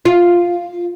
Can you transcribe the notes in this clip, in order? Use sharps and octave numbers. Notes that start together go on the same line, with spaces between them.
F4